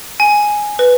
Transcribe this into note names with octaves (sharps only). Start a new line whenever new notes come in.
G#5
B4